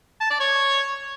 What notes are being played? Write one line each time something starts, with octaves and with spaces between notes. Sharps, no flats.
A5
D5
C#5